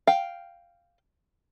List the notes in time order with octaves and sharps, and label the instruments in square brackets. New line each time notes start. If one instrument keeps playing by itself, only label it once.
[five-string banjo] F5 G5